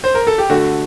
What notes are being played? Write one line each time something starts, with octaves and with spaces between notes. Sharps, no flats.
C5
A#4
A4
G4
D3 A3 F#4